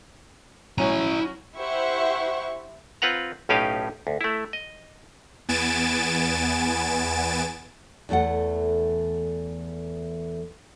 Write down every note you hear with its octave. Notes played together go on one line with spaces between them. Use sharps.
F#3 C#4 E4 A#5
E4 G4 C5 E5 F#5 C#6
C4 F4 B4 F#5 A#5
B1 A2 C#4 D#4 G4 F5
D2
A3 E4
D#5
E2 B3 G#5 A6 D7 E7
E2 E3 A3 A4 F#5